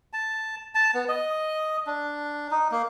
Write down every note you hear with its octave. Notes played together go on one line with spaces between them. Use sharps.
A5
A5
B3
D#5
D4
D#4
A#3